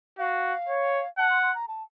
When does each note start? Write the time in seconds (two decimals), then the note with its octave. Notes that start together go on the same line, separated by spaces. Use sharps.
0.19 F#4 F5
0.68 C#5
1.18 F#5 A5
1.30 C6
1.43 C6
1.55 A#5
1.68 A5